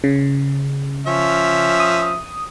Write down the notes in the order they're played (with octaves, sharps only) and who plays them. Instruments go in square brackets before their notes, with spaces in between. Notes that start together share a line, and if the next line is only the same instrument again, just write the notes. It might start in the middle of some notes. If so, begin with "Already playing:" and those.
[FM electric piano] C#3
[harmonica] F3 C#4 E5
[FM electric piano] D#6